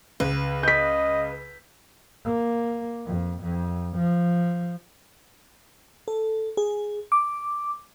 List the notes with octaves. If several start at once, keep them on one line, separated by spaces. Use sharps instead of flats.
C#2 B4
D#5 G6 B6
A#3
F2
F2
F3
A4
G#4
D6